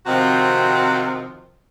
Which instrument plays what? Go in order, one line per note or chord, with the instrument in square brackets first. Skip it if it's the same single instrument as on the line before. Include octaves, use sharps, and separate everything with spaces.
[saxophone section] C3 D#3 F3 C4 F#4